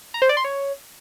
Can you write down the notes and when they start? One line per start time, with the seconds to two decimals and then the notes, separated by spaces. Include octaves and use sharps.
0.14 A#5
0.22 C5
0.29 D5
0.37 C6
0.44 C#5